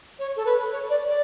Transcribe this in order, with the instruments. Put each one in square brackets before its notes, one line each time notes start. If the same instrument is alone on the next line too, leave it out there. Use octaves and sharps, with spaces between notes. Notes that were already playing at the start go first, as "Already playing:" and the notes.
[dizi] C#5
A4
B4
C#5
D5
D5